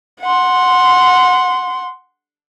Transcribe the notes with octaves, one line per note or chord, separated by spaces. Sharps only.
F#5 C6